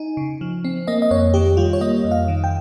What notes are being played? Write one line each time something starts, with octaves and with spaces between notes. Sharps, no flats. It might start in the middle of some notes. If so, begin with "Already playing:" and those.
Already playing: D#4 G#5
C#3
F3
C4
A#3 D#5
D#5
F2 C#5
D#3 G4
G3 F4
C#5
A#3 D#5
F2
F5
D#3
G5